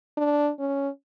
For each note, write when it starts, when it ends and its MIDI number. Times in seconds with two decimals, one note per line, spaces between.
0.18 0.51 62
0.59 0.89 61